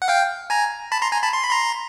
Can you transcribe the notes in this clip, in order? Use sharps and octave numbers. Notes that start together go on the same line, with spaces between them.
F#5
F5 G5
G#5 A#5
A5 B5
A#5 C6
G#5 A#5
A5 B5
C6
B5
A#5 C6